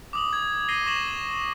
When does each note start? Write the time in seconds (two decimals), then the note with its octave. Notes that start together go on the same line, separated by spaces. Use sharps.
0.13 D6 D#6 F#7
0.33 G#6
0.69 A#6 C7 D#7 G7
0.86 C#6 A#6 E7 F#7